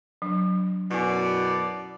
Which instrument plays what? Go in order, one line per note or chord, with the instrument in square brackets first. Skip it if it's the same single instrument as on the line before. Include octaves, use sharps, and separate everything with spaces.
[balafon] F#3 D4
[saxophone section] F#2 B2 [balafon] E4 G#5 [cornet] D5